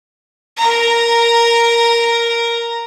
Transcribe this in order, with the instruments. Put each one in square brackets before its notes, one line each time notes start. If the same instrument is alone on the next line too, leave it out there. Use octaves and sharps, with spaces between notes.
[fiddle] A#4 A#5